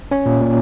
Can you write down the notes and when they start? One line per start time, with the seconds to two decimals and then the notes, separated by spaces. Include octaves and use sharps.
0.11 C#4 C#5
0.26 A#2
0.41 A#2